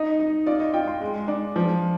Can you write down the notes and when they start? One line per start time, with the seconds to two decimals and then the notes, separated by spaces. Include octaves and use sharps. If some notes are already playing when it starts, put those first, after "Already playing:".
Already playing: D#4 D#5
0.19 D#4
0.46 F4 D5
0.60 D#5
0.74 F4 G5
0.88 C6
1.01 G#3
1.28 D4
1.56 F3